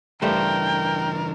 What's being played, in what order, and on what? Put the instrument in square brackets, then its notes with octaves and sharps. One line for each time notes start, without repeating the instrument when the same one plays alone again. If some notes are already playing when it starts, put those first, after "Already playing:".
[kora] G2 A3 C5 [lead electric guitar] C#3 E3 [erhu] A#4 [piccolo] G5